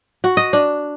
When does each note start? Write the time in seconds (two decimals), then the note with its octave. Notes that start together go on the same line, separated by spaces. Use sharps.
0.24 F#4
0.37 D#5
0.53 D4